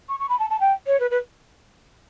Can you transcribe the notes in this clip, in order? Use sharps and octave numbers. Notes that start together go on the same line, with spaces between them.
C#6
C#6
B5
A5
A5
G5
C#5
B4
B4